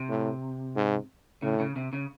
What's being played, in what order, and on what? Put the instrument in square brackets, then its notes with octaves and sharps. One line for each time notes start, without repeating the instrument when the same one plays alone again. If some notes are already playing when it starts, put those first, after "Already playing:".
Already playing: [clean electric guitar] C3
[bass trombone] A2
G#2
[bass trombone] A2 [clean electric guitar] C#3
[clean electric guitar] C#3
C3
C#3